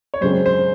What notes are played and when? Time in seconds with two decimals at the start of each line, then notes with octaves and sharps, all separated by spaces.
0.14 C#5
0.21 F#2 C#3 G#3 C4 C5
0.46 C5